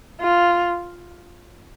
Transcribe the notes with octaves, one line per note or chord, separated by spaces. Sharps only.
F4